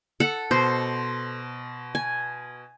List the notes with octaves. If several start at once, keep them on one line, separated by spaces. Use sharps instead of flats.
A4 F#5
B2 C5 C6
G#5